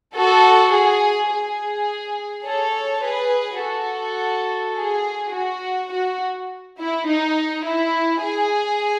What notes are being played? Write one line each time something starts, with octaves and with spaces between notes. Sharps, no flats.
F#4 A4
G#4
G#4
A4 C#5
G#4 B4
F#4 A4
G#4
F#4
F#4
E4
D#4
E4
G#4